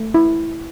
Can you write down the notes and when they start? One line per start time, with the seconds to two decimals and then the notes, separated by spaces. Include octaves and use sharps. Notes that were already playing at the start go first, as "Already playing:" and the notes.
Already playing: A3
0.14 E4